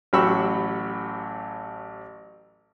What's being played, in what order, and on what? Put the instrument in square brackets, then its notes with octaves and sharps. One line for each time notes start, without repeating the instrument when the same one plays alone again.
[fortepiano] A1 F#3 G4 B5 C#6 E6